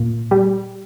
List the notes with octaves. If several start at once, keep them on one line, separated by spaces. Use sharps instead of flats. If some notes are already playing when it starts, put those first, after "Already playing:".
Already playing: A#2
G3